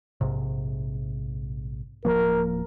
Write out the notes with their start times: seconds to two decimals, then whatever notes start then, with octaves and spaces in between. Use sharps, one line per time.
0.21 A#1 G#2 C3
2.05 D1 F3 A#3 A#4